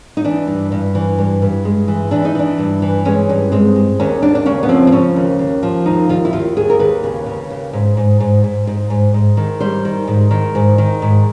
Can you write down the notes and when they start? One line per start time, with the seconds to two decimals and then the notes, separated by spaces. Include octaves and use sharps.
0.17 D#4
0.24 E3 D4
0.47 G2
0.72 G2
0.95 E3
1.18 G2
1.42 G2
1.65 G#3
1.88 E3
2.11 E3 D4
2.25 D#4
2.35 E3 D4
2.58 G2
2.82 E3
3.05 G#3 C#4
3.29 G2
3.52 G#3 C4
3.76 G#3
4.00 D#2 C#4
4.22 D#2 D4
4.35 D4
4.46 C#3 C#4
4.63 B3
4.69 F3 C4
4.87 C4
4.92 C#3 C#4
5.16 D#2
5.39 D#2
5.63 F3
5.86 D#2 D#4
6.09 D#2 F4
6.25 E4
6.33 D#2 F4
6.57 D#2 G#4
6.70 A#4
6.79 D#2 B4
7.04 C#3
7.26 C#3
7.50 D#2
7.73 G#2
7.97 G#2
8.20 G#2
8.44 G#2
8.67 G#2
8.90 G#2
9.14 G#2
9.37 D#3
9.60 G3 C5
9.85 D#3
10.08 G#2
10.31 D#3
10.55 G#2
10.78 D#3
11.02 G#2